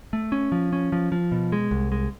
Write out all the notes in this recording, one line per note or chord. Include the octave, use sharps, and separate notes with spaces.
A3
C#4
F3
C#4
F3
F3
B2
G#3
C2
G#3